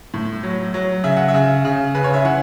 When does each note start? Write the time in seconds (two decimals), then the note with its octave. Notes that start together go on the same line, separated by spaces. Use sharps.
0.14 A2
0.43 F#3
0.74 F#3
1.04 C#3 E5
1.17 F#5
1.28 E5
1.34 C#3
1.65 C#3
1.95 C#3 B4
2.04 C#5
2.14 E5
2.25 E3 F#5